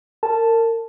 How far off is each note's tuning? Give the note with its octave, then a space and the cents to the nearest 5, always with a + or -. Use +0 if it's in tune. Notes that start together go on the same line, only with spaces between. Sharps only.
A#4 -30 A5 +0